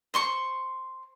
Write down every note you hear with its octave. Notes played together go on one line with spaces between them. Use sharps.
C5 C6 C#6